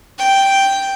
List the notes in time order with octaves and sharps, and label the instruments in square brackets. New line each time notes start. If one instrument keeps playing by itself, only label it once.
[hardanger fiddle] G5